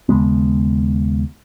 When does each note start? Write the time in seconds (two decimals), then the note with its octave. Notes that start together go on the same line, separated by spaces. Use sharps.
0.09 D#2 C#3 G#3 B3